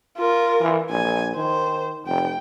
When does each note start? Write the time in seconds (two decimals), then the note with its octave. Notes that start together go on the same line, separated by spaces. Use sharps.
0.18 F4 A#4
0.60 E3
0.90 A#1 G#5
1.36 D#3 C5
2.07 F1 G5